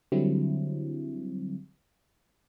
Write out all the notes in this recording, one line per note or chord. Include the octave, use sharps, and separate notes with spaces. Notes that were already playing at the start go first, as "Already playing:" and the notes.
D3 F#3 G3 C4 E4